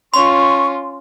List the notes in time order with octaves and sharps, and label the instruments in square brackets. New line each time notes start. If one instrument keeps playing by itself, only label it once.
[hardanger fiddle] C#4 F4 [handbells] C6 [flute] C#6